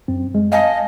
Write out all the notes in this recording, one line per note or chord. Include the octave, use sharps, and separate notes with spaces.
F#2 C4
G#3
D#5 F5 G#5 A5